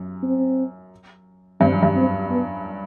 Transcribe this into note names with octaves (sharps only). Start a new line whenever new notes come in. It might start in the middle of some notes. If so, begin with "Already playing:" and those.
Already playing: F#2
C4
G2 C4
F#2
G2
C4
B3